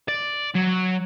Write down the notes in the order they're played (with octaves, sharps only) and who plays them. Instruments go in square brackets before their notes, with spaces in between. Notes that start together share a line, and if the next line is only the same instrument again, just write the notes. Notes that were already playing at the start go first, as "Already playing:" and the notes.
[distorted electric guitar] D5
F#3